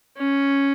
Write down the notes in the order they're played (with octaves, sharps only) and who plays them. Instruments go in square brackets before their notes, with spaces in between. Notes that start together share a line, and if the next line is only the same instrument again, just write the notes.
[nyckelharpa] C#4